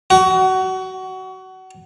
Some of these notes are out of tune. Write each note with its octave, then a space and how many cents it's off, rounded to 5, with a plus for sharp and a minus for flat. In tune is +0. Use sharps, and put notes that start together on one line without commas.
F#4 +25